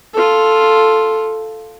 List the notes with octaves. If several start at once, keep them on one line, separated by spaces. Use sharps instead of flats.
F4 A4